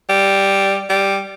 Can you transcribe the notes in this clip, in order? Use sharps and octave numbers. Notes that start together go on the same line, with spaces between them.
G3
G3